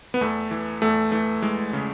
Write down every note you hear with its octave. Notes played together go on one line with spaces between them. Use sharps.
B3
E2 A3
E3
E2 A3
E3 A3
E3 G#3
C#3